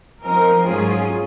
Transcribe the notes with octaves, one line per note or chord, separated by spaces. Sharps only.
F3 C4 D#4 A#4
G#2 F#3 C#4 F4 G#4